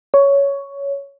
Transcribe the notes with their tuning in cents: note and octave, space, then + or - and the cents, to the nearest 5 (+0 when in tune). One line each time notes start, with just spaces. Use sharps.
C#5 +10